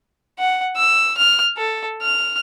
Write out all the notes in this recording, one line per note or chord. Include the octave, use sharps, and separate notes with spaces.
F#5
E6
F6
A4
F6